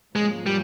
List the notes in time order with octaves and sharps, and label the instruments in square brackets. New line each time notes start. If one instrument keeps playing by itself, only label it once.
[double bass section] G#2 F3 A#3 C#4 [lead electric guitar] G#3
[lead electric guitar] G3